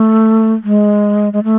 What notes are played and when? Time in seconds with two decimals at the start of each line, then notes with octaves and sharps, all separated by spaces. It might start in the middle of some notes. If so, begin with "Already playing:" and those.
Already playing: A3
0.63 G#3
1.33 G#3
1.44 A3